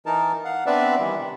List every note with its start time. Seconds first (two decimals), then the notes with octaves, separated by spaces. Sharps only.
0.06 E3 D#4 A#4 A5
0.45 F5 F#5
0.66 B3 C4 D4 B4 D5 E5
1.00 D#3 E3 G3 E4
1.19 C3